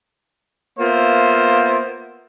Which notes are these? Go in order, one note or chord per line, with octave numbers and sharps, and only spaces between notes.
A#3 B3 F4 C5 E5